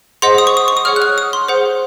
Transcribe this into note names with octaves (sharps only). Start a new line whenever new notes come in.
G#4 C5 D#5 F#5 C6
D#6
C#6
D#6
C#6
D#6
G#4 C#5 F#5 F6
F#6
F6
D#6
C6
G#4 C5 F#5